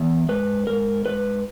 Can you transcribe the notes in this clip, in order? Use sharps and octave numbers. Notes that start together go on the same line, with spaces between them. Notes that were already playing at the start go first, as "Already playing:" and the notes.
Already playing: E2
G#2 B4
G#2 A#4
G#2 B4